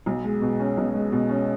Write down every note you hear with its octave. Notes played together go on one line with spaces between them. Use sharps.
B1
G#3
B2
C#4
B1
G#3
B2
C#4